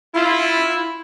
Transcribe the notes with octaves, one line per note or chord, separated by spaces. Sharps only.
E4 F4